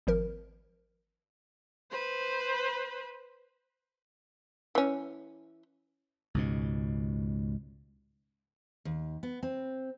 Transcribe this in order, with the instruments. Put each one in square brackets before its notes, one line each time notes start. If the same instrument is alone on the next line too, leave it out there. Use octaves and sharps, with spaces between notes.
[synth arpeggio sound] G#1 F3 A#4
[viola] B4 C5
[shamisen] E3 C#4
[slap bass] C#2 G#2 B2
[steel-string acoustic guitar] D#2
B3
C4